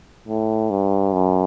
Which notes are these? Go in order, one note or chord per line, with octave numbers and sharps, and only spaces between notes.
A2
G2
F#2